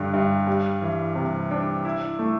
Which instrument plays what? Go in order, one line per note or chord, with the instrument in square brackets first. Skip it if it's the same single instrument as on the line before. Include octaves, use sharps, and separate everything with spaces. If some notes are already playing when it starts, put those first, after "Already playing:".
Already playing: [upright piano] G2 D3 G3
G2
G3
E3
C3
D4
E4
A3